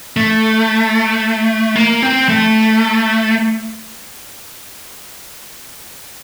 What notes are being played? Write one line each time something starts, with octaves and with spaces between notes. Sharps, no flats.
A3
A#3
C4
A3